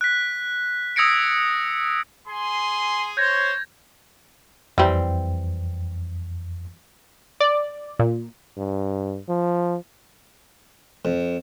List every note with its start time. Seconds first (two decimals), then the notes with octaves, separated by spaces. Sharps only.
0.01 F#6 B6
0.96 D#6 E6 G#6 A#6 C#7 D7
2.27 G#4 G#5 C6
3.17 C5 C#5 G6 G#6 A#6
4.78 F2 E3 G3 C4
7.40 D5
7.99 A#2
8.58 G2
9.29 F3
11.05 F2